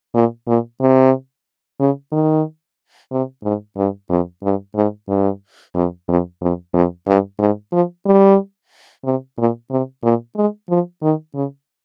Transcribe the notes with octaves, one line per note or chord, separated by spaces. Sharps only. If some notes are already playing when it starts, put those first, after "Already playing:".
A#2
A#2
C3
C#3
D#3
C3
G#2
G2
F2
G2
G#2
G2
F2
F2
F2
F2
G2
G#2
F3
G3
C3
A#2
C3
A#2
G#3
F3
D#3
C#3